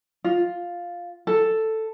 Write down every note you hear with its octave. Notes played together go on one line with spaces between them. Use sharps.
F4
A4